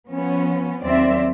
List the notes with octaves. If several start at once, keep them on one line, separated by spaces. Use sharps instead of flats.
F3 B3 C#4
D#2 F#3 C4 D5 E5